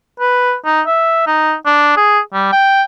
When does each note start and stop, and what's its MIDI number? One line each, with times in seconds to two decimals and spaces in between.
0.20 0.54 71
0.65 0.81 63
0.87 1.26 76
1.27 1.53 63
1.66 1.92 62
1.97 2.20 68
2.34 2.49 55
2.52 2.82 79